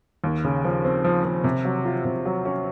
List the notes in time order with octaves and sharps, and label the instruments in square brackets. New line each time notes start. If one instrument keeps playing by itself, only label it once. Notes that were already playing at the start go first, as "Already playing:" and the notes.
[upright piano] D#2
C#3
F3
C4
F3
F3
C3
F#3
F4
C3
F#3
C#4